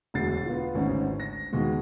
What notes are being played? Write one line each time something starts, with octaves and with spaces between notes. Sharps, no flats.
E1 D2 A6 C7
B3 F4
G#1 D2 C#4 D#4
A#6
D#2 B2 G#3